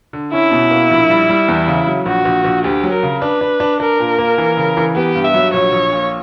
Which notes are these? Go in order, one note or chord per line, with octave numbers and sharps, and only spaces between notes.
D3
C#4 E4
B2
A#3
A#1
G3
G3
E2
C#3
F#3
A#1 F#4
A#1
A#1
D2 G4
F#3
A#4
C#3
D4 B4
D4
D4
D4 A#4
A#2
A#3
E3
C#3
E3
B3 G4
G2
E5
F#3
A#1 C#5
A#1
A#2